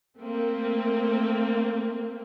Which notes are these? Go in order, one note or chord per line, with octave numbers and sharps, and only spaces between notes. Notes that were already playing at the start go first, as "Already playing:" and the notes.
A3 A#3 C4